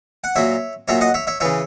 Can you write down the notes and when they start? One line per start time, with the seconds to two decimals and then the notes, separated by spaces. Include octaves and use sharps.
0.24 F#5
0.36 A#2 F#3 C#5 E5
0.88 A#2 F#3 C#5 E5
1.01 D#5 F#5
1.14 C#5 E5
1.27 C#5 E5
1.40 C#3 E3 C#5 E5